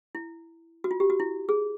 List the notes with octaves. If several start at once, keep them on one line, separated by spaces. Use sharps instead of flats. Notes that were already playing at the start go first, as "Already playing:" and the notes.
E4
F#4
F4
G4
F#4
E4
G#4